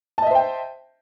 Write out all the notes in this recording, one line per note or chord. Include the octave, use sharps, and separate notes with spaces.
C5 D#5 E5 G5 A5